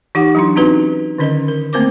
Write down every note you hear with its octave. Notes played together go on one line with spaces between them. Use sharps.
E3 D#4 G4 F#5 D6
F#3 D4 E4
C4 C#4 D#4 F#4 B4
D3 D#3 C#4 A#4 D#5
A#4
A3 A#3 C4 A#4 C5 D6